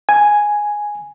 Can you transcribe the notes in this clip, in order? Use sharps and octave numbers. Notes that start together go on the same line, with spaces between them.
G#5